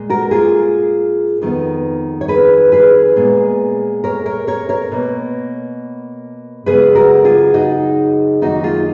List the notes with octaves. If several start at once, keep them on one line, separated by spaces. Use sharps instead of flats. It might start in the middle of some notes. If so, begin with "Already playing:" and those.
Already playing: A#2 G#3
F#4 A#4
F4 G#4
F2 D#3 G#3 B3
C#5
G#4 B4
G#4 B4
A#2 G#3 B3
A#4 C#5
A#4 C#5
A#4 C#5
A#4 C#5
B2 A#3
F#2 C#3 G#3 B3 G#4 B4
F#4 A#4
F4 G#4
D#4 F#4
F#2 D#3 A#3 D#4 F#4
F4 G#4